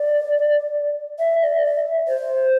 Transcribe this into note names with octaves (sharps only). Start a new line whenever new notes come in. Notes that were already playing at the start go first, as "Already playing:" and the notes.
Already playing: D5
E5
D5
E5
C5